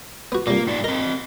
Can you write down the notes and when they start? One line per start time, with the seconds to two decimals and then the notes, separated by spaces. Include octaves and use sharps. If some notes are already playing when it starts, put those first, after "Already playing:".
0.32 B3 F#4
0.47 C2 A#2 A#3
0.67 G#2 D#4 D5
0.84 C4 A#4 D#5